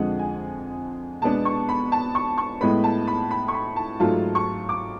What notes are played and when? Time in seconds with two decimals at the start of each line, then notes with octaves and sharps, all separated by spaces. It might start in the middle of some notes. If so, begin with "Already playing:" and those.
Already playing: F2 D3 F3 G#3 F#5
0.19 G#5
1.22 B2 G#3 B3 D4 A5
1.45 C#6
1.69 B5
1.92 A5
2.15 C#6
2.38 C#6
2.61 A2 G#3 B3 B5
2.84 A5
3.07 B5
3.31 B5
3.48 C#6
3.54 B5
3.76 A5
4.00 G#2 F#3 A3 F4 A5
4.35 C#6
4.69 D6